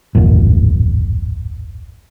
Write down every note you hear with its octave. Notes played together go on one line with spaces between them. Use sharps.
D1 G#1 F2 A#2